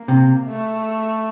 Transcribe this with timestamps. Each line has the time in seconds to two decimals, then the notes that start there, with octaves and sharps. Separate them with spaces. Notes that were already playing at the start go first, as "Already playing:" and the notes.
Already playing: A#3
0.08 C3
0.46 A3